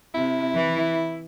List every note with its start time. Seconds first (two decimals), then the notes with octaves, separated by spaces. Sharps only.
0.15 C3 E4
0.55 E3